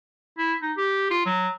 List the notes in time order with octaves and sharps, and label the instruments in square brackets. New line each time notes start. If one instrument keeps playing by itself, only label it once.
[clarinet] E4
D#4
G4
F4
F#3